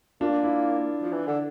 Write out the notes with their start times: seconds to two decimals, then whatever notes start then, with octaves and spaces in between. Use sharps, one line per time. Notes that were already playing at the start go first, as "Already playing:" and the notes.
0.21 A#3 D4 F4
0.44 E4
1.02 F3
1.13 E3
1.27 D3